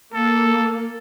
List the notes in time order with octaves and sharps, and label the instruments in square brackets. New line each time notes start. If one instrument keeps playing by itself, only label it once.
[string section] A#3 [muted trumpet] A4